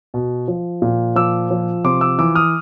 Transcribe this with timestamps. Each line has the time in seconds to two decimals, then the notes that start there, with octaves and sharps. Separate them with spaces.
0.14 B2
0.48 F3
0.82 A#2
1.16 F3 D6 E6
1.51 F3
1.84 C3 C6 D6
2.01 D6 E6
2.19 E3 D6 E6
2.35 D#6 F6